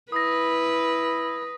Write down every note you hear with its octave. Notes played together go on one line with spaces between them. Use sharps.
E4 B4 D#6 A#6